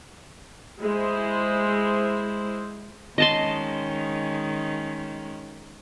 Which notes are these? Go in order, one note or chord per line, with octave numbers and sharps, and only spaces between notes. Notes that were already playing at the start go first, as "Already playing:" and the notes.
G#3 E4 C5
D#3 G#3 C#4 D#5 A5 C6